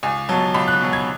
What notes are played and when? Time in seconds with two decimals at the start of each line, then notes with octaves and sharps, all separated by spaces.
0.03 C#2 G#5
0.29 B2 F#3 A5
0.54 C#2 B5
0.68 F#6
0.81 B2 F#3
0.93 G#6